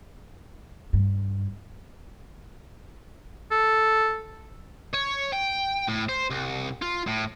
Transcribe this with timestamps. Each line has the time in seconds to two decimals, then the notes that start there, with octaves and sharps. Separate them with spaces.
0.93 G2
3.51 A4
4.93 C#5
5.33 G5
5.88 A2
6.09 C5
6.30 C2
6.82 F4
7.07 A2